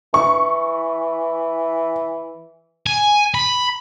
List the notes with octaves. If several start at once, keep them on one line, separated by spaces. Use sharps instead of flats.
E3 C#6
G#5
B5